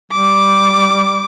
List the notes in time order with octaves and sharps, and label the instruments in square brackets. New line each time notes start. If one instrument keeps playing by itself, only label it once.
[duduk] G3 [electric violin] D6